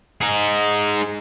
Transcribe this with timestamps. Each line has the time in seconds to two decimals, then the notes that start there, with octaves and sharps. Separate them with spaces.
0.21 D#4 G#4